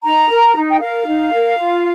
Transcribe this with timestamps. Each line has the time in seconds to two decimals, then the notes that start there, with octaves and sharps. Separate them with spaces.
0.04 D#4 A#5
0.29 A#4
0.55 D#4
0.71 G5
0.80 A#4 F5
1.06 D#4
1.32 A#4
1.57 F4